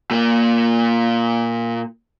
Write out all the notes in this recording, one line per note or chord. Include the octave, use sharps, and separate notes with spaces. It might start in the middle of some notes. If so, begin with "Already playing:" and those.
A#2 A#3